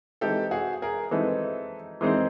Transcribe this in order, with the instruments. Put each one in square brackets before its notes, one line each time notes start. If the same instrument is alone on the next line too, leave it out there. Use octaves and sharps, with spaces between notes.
[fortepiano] E3 G#3 C4 D#4 [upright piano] G4 A4
[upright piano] F#4 G#4
G#4 A#4
[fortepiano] E3 G#3 C4 D#4 [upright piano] A4 B4
[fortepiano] E3 G#3 C4 D#4 [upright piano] A#4 C5